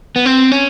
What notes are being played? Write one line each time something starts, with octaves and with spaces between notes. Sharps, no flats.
B3
C4
C#4